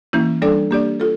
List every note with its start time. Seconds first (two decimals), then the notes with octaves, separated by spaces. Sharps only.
0.13 E3 A#3 C#4 E4
0.42 G3 D4 A4 D5
0.71 A#3 D4 G4 D5
1.00 F4 A4